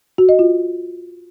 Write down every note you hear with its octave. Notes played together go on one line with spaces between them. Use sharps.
F#4
D#5
F4